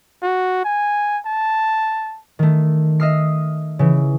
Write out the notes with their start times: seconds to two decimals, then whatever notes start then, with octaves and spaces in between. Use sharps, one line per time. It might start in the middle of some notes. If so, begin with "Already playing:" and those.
0.23 F#4
0.64 G#5
1.26 A5
2.39 D#3 A3
3.00 D#5 E5 D#6 F6 C7
3.79 C#3 E3